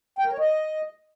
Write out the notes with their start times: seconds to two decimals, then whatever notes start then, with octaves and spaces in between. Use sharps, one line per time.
0.19 G5
0.25 A#4
0.32 C#5
0.39 D#5